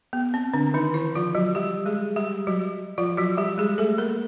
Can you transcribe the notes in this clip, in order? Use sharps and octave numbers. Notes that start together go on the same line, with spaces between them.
B3
C4
D3 D4
D#3 D#4
E3 E4
F3 F4
F#3 F#4
G3 G4
G#3 G#4
G3 G4
F#3 F#4
F3 F4
F#3 F#4
G3 G4
G#3 G#4
A3 A4
A#3 A#4